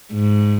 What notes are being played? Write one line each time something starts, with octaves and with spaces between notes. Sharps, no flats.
G#2